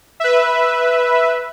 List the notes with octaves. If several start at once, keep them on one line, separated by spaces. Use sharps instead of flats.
B4 E5